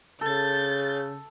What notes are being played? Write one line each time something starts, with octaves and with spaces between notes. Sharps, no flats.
C#3 A4 G6 A6